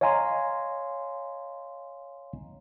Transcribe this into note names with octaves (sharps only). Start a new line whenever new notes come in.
C#5 D#5 F5 G#5 A#5 C6